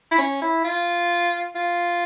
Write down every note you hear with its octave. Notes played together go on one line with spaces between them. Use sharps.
E4
C#4
E4
F4
F4